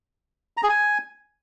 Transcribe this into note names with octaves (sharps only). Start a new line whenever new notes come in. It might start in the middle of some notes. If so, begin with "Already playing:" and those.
A#5
G#4
G#5